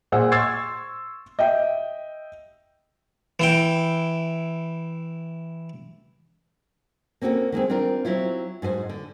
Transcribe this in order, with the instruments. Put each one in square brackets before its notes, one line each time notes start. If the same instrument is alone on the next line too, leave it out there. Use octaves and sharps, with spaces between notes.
[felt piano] A#2 G#4 C5 F#5 E6
C6 C#6 E6 G#6 A6 C7
D#5 E5 G5
[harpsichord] E3 E4 G5
[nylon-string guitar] A#3 C4 C#4 F#4 A4
D#3 G3 G#3 C4
C4 D4 F4 A#4
F#3 C4 E4 F4
G#2 F#4 G#4 C5
D3